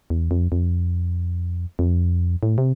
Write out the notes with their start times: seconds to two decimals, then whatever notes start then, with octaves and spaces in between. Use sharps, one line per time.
0.10 E2
0.31 F2
0.52 F2
1.79 F2
2.43 A2
2.58 C3